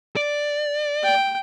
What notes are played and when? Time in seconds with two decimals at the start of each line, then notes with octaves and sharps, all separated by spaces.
0.16 D5
1.04 G5